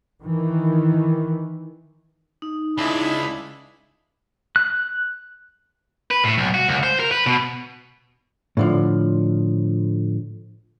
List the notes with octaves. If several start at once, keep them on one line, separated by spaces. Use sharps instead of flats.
D#3 E3
D#4
C#2 G#3 D4 E4 B5
F#6
B4
A2
B1
F#4
C#2
C5
A#4
B4
B2
A2 D3 F3